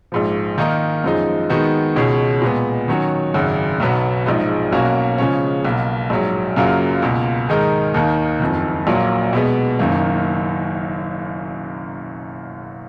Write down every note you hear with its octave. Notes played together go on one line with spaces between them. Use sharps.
A#1 G#2 F3
D#3 A#3 D#4 A#4
F#2 F3 G#3 D#4
D#3 G#3 B3 D#4 F#4
C#2 B2 G#3 C#4 G#4
A#2 G#3 B3
D#3 F#3 C#4 F#4
G#1 F#2 C#3
B1 B2 F#3 B3
A#1 G#2 F3 G#3 D#4
B1 B2 A#3 C#4 F#4
C#3 F3 G#3 C#4
B1 B2 A#3
A#1 G#2 F#3
F#2 C#3 F#3 A#3 F4
C#2 B2 A#3
G#2 D#3 G#3 D#4 A#4
D#2 D#3 A#3 D#4
F#1 F2 D#3
A#1 A#2 F#3 A#3
B2 G#3 B3
F#1 F#2 D#3 A#3